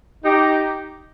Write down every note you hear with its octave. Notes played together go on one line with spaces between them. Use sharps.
D#4 G4